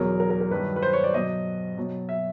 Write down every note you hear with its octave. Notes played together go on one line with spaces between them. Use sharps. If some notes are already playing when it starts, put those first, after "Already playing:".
Already playing: E2 B2 F#3 A#4
A#4
A#4
A#4
G2 D#3 F#3 B4
B4
C5
C#5
D5
B2 F#3 D#5
B2 F#3
E5